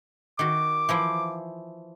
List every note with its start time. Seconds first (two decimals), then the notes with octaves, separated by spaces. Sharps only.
0.39 D#3 F#4 D6
0.89 E3 F3 E4